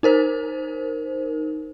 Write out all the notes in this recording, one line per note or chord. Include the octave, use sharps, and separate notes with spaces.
D#4 A#4 C5